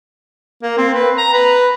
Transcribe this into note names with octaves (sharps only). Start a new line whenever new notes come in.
A#3
C4
B4
A#5
B4